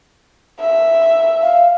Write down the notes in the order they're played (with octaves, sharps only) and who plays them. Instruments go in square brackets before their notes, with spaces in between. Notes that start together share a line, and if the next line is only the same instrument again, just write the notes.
[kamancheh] E5
[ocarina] F5